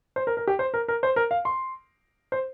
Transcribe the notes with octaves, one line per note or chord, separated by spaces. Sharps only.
C5
A#4
A#4
G4
C5
A#4
A#4
C5
A#4
F5
C6
C5